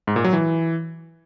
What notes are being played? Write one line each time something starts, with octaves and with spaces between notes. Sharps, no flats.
G#2
A#2
F#3
E3